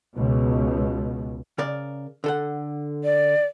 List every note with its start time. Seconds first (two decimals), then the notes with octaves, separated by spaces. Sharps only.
0.15 C#2 B2
1.58 C#3 A#4 D5
2.24 D3 A4 F#5
3.04 D5